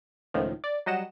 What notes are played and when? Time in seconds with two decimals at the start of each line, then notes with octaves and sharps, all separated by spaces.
0.34 C#2 A2 D#3 F3
0.64 D5
0.86 F#3 G3 D#5 F#5 E7